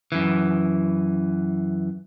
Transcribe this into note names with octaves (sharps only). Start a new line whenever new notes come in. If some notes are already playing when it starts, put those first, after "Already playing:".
F#2 E3